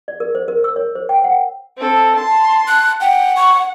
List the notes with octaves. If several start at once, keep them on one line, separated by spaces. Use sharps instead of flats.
D5
A#4
C5
A#4
E6
C#5
C5
G5
F#5
C4 A4
A5 C6
F#6
F#5 G5
C#6